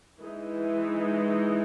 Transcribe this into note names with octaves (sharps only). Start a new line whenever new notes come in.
E3 G#3 D#4